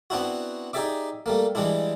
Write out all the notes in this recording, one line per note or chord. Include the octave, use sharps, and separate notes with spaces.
B3 C4 D4 E4 F#4
D#4 G4 G#4 D5 E5 D6
G3 A3 A#3
E3 G3 G#3 D4 E4